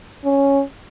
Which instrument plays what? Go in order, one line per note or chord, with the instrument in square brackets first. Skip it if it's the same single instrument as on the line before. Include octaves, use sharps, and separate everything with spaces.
[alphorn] C#4